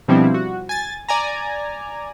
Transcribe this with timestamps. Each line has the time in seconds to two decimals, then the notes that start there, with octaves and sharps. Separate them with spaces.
0.08 B2 F3 G3 C4 D4 E4
0.34 F#4
0.69 G#5 A6
1.09 D5 G#5 A#5